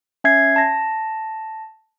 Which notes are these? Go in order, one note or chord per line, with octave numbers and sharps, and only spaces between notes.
C#4 E5 G#6 C7
A5 A#6